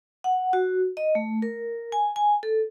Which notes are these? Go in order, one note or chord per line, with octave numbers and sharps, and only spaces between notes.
F#5
F#4
D#5
A3
A#4
G#5
G#5
A4